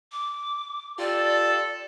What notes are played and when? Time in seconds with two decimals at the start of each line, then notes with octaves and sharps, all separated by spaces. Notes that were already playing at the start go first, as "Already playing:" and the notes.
0.12 D6
0.99 F4 G4 A4 D5